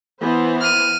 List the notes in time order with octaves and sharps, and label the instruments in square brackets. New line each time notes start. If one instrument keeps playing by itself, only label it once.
[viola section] E3 B3 C5
[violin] F6 D#7